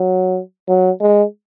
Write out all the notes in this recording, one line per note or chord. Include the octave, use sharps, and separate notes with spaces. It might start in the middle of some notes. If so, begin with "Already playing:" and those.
Already playing: F#3
F#3
G#3